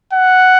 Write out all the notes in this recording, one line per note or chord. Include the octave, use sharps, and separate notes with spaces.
F#5